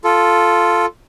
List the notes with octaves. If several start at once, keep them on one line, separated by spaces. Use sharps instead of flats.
F4 A4